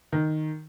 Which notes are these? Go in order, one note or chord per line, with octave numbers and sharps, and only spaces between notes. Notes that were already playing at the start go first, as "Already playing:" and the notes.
D#3